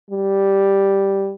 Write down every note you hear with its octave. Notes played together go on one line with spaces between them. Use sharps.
G3